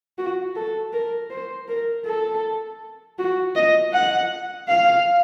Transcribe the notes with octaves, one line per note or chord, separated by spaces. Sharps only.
F#4
A4
A#4
C5
A#4
A4
F#4
D#5
F#5
F5